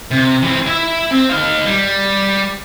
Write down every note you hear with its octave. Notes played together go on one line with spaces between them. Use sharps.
C3
E3 C4
E4 E5
C4
D#4 F5
G3